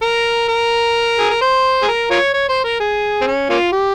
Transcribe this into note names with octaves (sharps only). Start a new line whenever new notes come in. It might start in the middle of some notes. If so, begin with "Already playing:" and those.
A#4
A#4
G#4
A#4
C5
G#4
A#4
F4 A#4 C#5
C#5
C5
A#4
G#4
C4
C#4
A#3 C#4 F4
G4